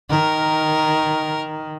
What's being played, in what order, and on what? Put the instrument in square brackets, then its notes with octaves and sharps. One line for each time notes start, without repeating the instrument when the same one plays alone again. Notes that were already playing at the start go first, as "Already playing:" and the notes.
[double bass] D#3 [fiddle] A#4